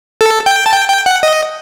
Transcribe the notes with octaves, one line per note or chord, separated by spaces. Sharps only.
A4
G5
A5
G5
G5
F#5
D#5